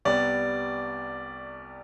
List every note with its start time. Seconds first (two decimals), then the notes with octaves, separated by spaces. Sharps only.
0.05 C2 C3 G3 B3 D5